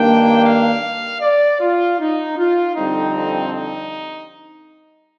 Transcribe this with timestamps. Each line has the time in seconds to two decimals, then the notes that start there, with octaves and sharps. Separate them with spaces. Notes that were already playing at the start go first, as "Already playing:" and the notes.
Already playing: G2 D#3 A#3 D4 G5
0.44 F5
1.21 D5
1.60 F4
1.99 D#4
2.37 F4
2.76 F2 D3 G3 C4 D#4
3.53 D#4